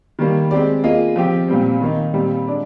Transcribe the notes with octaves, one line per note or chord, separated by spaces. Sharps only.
D#3 G3 A#3
G#3 C4 G4 D5
A#3 F4 G#4 D#5
F3 C4 G4
A#2 G3 C4
D#3 A#3 D#4
A#2 G3 C4
G#3 D4 G#4 D5